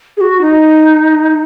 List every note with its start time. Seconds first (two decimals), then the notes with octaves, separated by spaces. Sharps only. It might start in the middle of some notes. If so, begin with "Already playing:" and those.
0.17 G#4
0.21 F#4
0.41 D#4